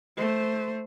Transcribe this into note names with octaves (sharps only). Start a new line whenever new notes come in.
A3 C5